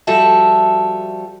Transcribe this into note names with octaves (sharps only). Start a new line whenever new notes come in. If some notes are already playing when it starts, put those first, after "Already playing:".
F3 G3 F#4 A4 E5 A5